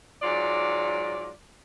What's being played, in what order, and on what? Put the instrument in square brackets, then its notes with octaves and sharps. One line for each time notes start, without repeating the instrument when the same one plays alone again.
[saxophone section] G#2 F#3 F4 D5